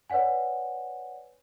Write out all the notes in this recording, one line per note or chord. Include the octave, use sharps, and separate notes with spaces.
B4 C#5 D5 F#5 G#5